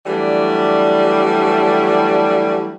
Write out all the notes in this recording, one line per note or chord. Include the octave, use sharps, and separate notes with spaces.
E3 F#3 G3 A3 D4